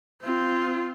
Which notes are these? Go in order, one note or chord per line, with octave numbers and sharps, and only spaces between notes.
C4 F4